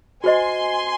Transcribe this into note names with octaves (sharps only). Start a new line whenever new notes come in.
F#4 C5 D#5 G#5 C6